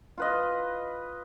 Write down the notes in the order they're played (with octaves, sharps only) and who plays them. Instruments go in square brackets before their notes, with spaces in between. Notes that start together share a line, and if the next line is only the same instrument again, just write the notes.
[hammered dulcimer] F4 B4 D#5